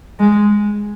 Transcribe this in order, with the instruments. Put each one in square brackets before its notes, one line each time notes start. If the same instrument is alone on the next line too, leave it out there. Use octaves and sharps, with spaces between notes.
[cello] G#3